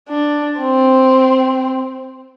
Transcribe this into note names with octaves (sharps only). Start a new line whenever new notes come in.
D4
C4